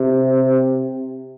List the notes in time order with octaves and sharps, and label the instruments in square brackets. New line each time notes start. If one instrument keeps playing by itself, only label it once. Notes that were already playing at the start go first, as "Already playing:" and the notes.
Already playing: [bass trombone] C3